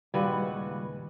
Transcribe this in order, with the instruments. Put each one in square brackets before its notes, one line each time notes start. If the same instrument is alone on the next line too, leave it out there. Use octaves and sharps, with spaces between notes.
[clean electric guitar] D#2 G#3 D#4 [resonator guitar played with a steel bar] A#2 F#4 B4 [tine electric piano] C#3 [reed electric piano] G3